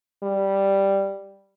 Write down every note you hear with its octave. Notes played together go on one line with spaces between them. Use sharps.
G3